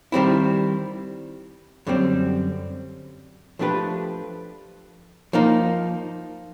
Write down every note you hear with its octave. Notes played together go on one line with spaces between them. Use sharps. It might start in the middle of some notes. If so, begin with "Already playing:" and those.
D#3 G3 C4 E4
F#2 D3 G3 C4
F3 A3 D4 G4 B4
F3 A#3 D#4